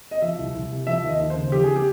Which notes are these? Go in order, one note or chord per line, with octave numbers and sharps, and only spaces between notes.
D#5
F3 E5
C2
C2
C3
F3 E5
D#2 D#5
D#2
C5
C#3
F3 G4
G#4
G4